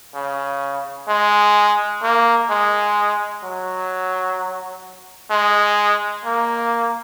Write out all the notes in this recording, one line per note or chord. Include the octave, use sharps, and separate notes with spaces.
C#3
G#3
A#3
G#3
F#3
G#3
A#3